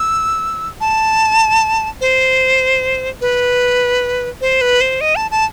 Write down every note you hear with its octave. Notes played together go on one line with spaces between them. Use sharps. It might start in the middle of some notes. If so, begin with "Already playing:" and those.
Already playing: E6
A5
C5
B4
C5
B4
C5
D#5
A5
A5